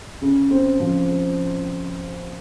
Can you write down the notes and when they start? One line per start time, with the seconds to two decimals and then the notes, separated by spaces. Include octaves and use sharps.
0.22 C#3
0.51 C4
0.80 F3
1.09 G#3